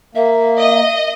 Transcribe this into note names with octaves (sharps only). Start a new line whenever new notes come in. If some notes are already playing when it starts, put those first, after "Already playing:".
A#3 E5
D#5